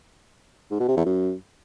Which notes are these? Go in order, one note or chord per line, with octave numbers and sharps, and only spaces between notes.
G#2
B2
C3
E2
F#2